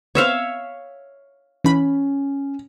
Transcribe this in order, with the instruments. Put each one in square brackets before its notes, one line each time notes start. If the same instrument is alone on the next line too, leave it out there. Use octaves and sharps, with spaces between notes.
[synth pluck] B3 C4 [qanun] C#5 E5 F5
[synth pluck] E3 B5 [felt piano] C#4